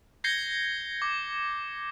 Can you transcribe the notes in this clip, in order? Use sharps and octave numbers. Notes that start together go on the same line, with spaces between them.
G6 G#6 A#6 C7 C#7 G7
D6